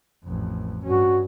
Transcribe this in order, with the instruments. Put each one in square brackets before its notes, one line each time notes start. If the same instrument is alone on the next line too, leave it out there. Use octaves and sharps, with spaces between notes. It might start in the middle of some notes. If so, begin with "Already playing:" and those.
[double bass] A1 F2
[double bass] G2 C#4 [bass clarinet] F#4